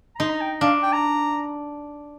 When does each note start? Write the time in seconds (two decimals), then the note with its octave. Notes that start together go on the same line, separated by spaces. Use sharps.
0.16 A#5
0.19 D#4 C6
0.30 A#5
0.41 G5
0.61 D4 F5
0.83 G5
0.93 A#5